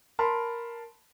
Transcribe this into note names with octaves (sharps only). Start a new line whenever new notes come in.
A#4 A5 B5 C6